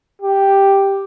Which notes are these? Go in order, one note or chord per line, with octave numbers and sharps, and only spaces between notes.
G4